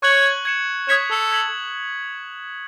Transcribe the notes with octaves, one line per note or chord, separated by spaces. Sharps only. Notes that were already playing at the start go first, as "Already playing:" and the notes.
C#5 C#6 F#6 C#7 F#7
G#6 C#7 E7
C#5 D#6 G#6 B6 E7
A4
G#6 B6 F#7